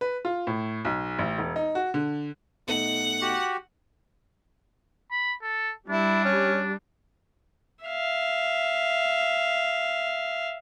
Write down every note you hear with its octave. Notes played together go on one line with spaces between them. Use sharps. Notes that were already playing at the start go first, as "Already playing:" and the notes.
B4
F4
A2
B1
A1
E1
D#4
F#4
D3
B1 A3 D#4 F#5
F#4 G4
B5
A4
G3 D4 E4
C#4
E5 F5